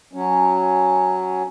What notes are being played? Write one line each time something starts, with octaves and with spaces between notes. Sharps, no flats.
F#3 C#4